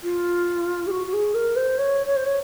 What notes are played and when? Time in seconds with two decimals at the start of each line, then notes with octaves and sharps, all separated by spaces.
0.03 F4
0.87 G#4
0.90 F#4
1.07 F#4
1.13 G#4
1.34 A#4
1.56 C5
1.78 C#5
2.06 C#5
2.16 C5
2.25 C#5